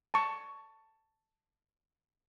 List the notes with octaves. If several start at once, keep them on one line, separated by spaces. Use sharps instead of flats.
A5 C#6